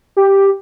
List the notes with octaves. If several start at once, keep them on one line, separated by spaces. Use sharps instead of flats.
G4